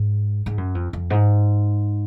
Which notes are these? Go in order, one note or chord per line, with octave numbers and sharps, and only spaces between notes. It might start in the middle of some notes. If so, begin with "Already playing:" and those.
Already playing: G#2
G#2
F#2
F2
F2
G#2